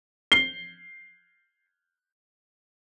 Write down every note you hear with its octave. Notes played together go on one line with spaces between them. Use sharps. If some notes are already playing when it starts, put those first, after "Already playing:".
C7 G7